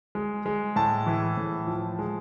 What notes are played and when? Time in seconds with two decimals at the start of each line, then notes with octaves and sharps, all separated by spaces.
0.15 G#3
0.46 G#3
0.76 A2 A5
1.06 E3
1.37 A2
1.67 F3
1.99 G#3